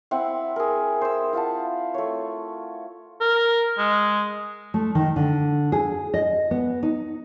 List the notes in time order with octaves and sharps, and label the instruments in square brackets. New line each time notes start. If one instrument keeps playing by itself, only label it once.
[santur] C4 E4 F#5
G#4 A#4
C5 E6
E4 F4 F#5 A5
A3 C#5
[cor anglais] A#4
G#3
[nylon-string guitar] A3
D#3
D3
G#4
D#5
B3
D#4